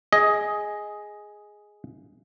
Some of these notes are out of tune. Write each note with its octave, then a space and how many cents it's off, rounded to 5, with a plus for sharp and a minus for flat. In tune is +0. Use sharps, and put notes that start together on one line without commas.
G#4 +0 D#5 +10